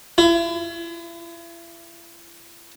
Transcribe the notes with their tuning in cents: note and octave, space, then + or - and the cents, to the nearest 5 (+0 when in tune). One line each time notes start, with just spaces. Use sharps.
E4 +40